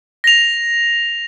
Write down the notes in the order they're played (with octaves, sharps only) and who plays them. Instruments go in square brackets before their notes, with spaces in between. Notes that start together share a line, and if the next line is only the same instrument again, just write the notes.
[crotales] A#6 F7